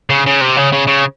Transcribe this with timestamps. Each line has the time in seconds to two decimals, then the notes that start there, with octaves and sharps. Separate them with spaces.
0.10 C#3
0.26 C#3
0.41 C3
0.57 C#3
0.73 C#3
0.87 C#3